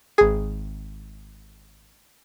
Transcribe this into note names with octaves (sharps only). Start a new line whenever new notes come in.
G#1 G#4